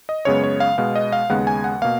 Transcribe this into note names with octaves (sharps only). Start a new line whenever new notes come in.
D#5
F#2 C#3 G#3 B3 C#5
C#5
F5
B2 G#3 B3 F5
D#5
F5
D#2 C#3 G#3 B3 F#5
G#5
F#5
B2 A#3 F5